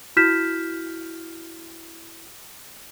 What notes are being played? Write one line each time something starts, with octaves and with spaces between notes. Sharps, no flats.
E4 F#4 F6 G6 B6 E7